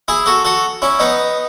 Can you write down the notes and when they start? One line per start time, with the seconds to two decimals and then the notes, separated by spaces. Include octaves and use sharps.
0.08 E4 G#4
0.26 F#4 A4
0.44 F#4 A4
0.82 C#4 E4
0.99 B3 D#4